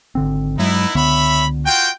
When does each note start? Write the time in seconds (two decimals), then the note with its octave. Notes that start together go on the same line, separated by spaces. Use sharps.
0.15 G#1 D3 C4
0.58 G2 F#3 G#3 B3 D#4 E4
0.95 C#2 D3 B3 C#5 E5 B5
1.65 F4 F#4 G5